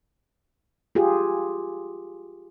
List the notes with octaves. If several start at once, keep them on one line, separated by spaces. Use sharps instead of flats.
F4 G4 G#4